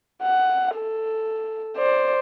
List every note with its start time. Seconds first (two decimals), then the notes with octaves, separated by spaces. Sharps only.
0.22 F#5
0.76 A4
1.77 C5 D5